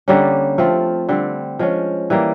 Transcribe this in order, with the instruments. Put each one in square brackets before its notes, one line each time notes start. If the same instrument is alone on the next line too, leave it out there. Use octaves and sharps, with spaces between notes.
[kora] D3 G3 A#3 C#4
F3 A3 C4 F4
D3 G3 C4
F3 G#3 C#4
E3 G3 A#3